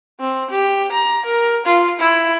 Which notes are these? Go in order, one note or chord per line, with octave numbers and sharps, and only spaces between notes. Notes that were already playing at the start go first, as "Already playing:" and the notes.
C4
G4
A#5
A#4
F4
E4